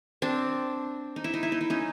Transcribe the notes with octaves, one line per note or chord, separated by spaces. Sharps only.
C4 D4
D#4
E4
D#4
E4
D#4
E4
C#4 D#4